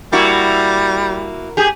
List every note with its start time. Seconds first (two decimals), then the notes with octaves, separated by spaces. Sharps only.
0.12 G3 A#3 E4 F#4
1.57 G4 G#4